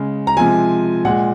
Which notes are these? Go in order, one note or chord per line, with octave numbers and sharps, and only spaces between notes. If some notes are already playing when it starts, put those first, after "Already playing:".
Already playing: C#3 G#3
A#5
C3 F3 G#3 G#5
A#2 G#3 F#5